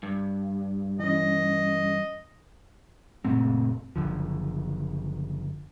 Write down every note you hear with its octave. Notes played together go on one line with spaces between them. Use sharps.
G2
E3 C#4 D#5
F#1 A#2 A3 C4
F#1 C2 D3 F3